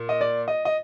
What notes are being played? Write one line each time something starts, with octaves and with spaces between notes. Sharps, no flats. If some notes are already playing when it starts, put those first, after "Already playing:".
Already playing: A#2
D#5
D5
D#5
D#5